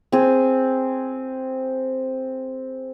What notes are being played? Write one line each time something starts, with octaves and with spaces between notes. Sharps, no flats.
C4 G#4